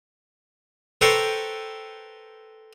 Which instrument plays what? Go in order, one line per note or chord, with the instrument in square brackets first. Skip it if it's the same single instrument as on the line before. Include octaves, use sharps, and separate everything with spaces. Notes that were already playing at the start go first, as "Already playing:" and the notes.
[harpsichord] A4 B4 C5 G5 A#5 C#6